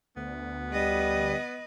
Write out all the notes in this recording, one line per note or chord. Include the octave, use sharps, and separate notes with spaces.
D2 B3
G3 B4 D#5